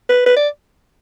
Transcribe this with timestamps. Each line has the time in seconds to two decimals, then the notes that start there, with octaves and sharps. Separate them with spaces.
0.09 B4
0.26 B4
0.37 D5